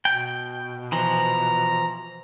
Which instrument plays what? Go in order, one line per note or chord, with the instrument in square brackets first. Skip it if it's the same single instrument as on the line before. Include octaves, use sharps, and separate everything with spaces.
[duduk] B2 [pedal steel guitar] G5
[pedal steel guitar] E3 F3 [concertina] A#5